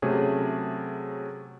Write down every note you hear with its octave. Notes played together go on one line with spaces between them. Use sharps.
C3 F#3 A3 C#4 G#4